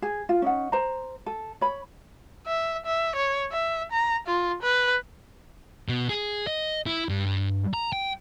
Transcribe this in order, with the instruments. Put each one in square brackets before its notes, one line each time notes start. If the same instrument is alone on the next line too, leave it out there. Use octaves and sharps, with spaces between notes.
[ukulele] G#4
F4
C#4 D#4 F#5
C5 A#5
A4
C#5 B5
[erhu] E5
E5
C#5
E5
A#5
F4
B4
[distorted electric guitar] B2
G#4
D#5
E4
G2
A#5
G5